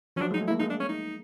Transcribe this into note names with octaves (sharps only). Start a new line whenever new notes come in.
F3 C#4
F#3 D4
G#3
D#4
A3
E4
A#3
G#3 D#4
D4
C#4
D#4